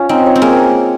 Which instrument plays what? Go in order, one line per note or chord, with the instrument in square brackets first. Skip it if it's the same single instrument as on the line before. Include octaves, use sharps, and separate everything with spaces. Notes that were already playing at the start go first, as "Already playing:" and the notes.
Already playing: [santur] C#4 F4
[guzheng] C4 [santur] D#4
[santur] C#5
[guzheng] C4
[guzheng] A#3 [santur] G#4